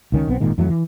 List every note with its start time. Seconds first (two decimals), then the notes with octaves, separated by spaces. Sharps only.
0.12 C#2 D#3 C#4
0.28 B1 B3 C4
0.40 G#1 A#2 D#3 G#3
0.58 F2 E3 F#3 A3
0.70 E3